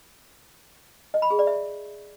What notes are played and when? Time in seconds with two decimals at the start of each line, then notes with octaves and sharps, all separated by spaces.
1.14 D#5
1.22 B5
1.31 G#4
1.39 D5
1.47 E5